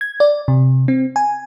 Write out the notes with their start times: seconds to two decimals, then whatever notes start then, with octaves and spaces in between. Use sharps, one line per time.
0.01 G#6
0.20 D5
0.48 C3
0.88 C4
1.16 G#5